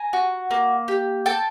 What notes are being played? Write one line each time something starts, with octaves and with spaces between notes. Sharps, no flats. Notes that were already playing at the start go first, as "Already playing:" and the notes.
Already playing: G#5 A#5
F#4
A#3
G4
A4 G5 A5